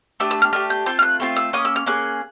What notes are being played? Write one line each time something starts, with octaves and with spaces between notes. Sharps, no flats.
A3 D4 G4 E6
E6
F6
A3 D4 G4 F6
G6
A3 C4 F4 G6
F6
F#6
A3 C4 F4
E6
A#3 C#4 D#6
E6
F6
A#3 C#4 G#4 F#6